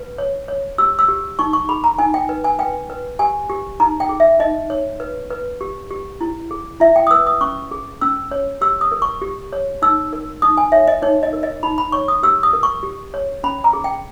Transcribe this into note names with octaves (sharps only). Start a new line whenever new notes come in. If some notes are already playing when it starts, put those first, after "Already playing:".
Already playing: B4
C#5
C#5
G4 E6
E6
G4
D#4 C#6
C#6
G#4 B5
A#5
D#4 G#5
G5
B4
G#5
B4 G5
B4
G4 G#5
G4
D#4 A#5
G5
G#4
E5
D#4 D#5
C#5
B4
B4
G4
G4
E4
G#4
E4 E5
G5
D#6
B4 E6
D#6
C#4 C#6
G#4
C#4 E6
C#5
G4 E6
D#6
A#4
C#6
G4
C#5
D#4 E6
A#4
D#4 D#6
G#5
C#5 E5
D#5
D#4 C#5
D#5
A#4
D#5
D#4 B5
B5
C#5 C#6
D#6
G4 E6
D#6
A#4
C#6
G4
C#5
C#4 B5
A#5
G#4
G5